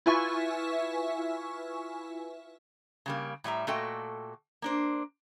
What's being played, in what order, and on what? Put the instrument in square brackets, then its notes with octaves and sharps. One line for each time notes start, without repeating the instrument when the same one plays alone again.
[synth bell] E4 F4 B4 E5 G#5 C#6
[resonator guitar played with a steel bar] C#3 G3 A#3
A2 G3 E5 A#5
A#2 A3 F#4 A4 D#5 G5
A#3 D4 C5